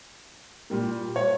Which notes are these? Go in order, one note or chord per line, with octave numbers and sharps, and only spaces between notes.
A#2 G3 A#3
C#5